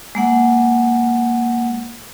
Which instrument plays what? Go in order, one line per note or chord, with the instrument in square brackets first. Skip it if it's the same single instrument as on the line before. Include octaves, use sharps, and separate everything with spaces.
[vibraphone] G#3 A#3 F#5